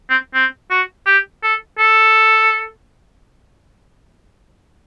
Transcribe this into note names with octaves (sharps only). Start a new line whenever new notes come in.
C4
C4
F#4
G4
A4
A4